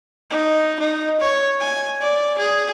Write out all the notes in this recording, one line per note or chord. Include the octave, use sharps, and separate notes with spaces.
D#4
D#4
C#5
G#5
D5
G#4